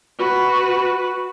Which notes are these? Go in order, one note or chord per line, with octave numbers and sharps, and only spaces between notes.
F#4 B4